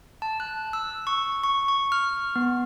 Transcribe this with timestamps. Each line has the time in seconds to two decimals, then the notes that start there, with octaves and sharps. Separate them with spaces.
0.22 A5
0.40 F#6
0.73 E6
1.07 C#6
1.43 C#6
1.68 C#6
1.92 F6
2.36 B3